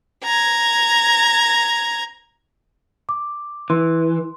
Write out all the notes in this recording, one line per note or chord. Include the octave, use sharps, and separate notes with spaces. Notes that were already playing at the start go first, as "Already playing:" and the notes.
A#5 G#6
D6
E3 C6